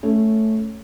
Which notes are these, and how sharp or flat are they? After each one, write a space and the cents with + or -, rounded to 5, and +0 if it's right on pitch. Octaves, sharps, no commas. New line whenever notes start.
A3 +0 C#4 +0